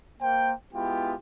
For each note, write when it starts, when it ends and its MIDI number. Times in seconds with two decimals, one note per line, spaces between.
0.20 0.53 58
0.20 0.53 72
0.20 0.53 79
0.73 1.14 56
0.73 1.14 59
0.73 1.14 64
0.73 1.14 65
0.73 1.14 67
0.73 1.14 79